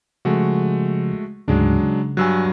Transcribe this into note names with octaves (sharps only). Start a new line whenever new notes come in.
C#3 F3 G#3 A3 F#4
D2 G#2 C#3 F#3 G#3 D4
C#3
G2 F#3 G#5 E6 F#6